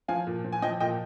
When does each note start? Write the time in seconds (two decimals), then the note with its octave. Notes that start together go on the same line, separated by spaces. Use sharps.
0.08 F3 F5 G#5
0.27 A#2
0.44 F3
0.52 G#5
0.62 F3 D#5 G5
0.80 A#2 D#5 G5